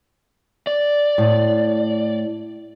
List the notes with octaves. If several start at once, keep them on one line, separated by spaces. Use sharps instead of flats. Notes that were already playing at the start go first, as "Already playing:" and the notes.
D5
A2